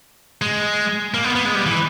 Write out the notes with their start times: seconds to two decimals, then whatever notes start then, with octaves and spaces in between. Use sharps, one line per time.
0.42 G#3
1.14 A#3
1.24 B3
1.35 B3
1.45 G#3
1.55 G3
1.66 E3